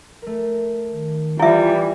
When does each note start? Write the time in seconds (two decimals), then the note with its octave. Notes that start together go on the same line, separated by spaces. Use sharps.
0.22 A3 A#4
0.92 D#3
1.39 E3 G3 E4 F4 E5